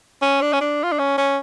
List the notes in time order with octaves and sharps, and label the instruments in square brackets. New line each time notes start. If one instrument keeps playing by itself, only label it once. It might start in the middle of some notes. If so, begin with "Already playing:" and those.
[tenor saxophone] C#4
D4
C#4
D4
F4
D4
C#4
C#4